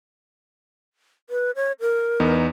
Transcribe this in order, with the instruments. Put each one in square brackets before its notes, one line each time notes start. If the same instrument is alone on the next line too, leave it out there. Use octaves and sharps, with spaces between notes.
[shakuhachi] B4
C#5
A#4
[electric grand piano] E2 B3 D#4